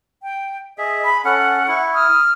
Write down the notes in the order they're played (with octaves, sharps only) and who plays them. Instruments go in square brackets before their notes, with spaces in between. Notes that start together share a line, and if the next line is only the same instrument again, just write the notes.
[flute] G5
[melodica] G#4 E5 [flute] D#5
[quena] B5 [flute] B6
[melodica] C#4 [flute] A4 [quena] F#5
[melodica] E4 [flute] C#6
[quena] D#6 [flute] F6